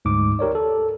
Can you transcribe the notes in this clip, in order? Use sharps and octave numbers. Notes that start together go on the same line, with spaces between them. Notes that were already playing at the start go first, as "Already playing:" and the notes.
D2 G#2 D6
G4 A#4 C#5 D5
A4